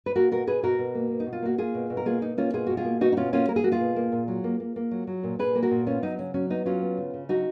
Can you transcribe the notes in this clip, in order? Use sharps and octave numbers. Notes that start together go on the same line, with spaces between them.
B4
A#3 F#4 A#4
B2 F#4 A#4
B2 G#4 B4
B2 F#4 A#4
B2
A#3
B2
D#4
B2
F4
A#3 F#4
A#3 F4 G#4
B2
B2
A#4
A#3 F4 G#4
B2 D#4
A#3 C#4 F4
B2 F4 G#4
B2 F#4
F4 G#4
A#3
B2 D#4 F#4
D#4
B2 C#4 F4
A#3 C#4 F4
A#3 A#4
G#4
A#3 F#4
F4 G#4
B2
A#3
A#2
F#3
A#3
A#3
A#3
F#3
F#3
A#2
A#2 G#4 B4
A#3 G#4
F#4 A#4
A#2
B3 C#4 F4
F#3 D#4
C#3 C#4
F#3 C#4
B3 D#4
F#3 C#4 F4
B3
C#3
C#3
F#3 D#4 F#4